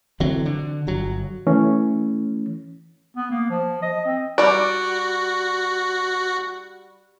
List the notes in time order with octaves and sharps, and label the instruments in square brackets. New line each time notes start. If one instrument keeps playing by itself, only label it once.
[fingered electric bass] D3 E3 F#3 C4
D3
G1 F#3
[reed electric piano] E3 A3 C#4
[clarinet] B3
A#3
F3
D#5
C4
[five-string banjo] G3 D5 [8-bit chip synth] F#4